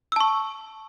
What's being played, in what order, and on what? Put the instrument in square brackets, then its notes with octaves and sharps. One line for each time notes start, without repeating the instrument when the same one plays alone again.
[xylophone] E6
A5
C#6